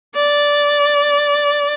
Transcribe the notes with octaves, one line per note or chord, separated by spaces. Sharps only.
D5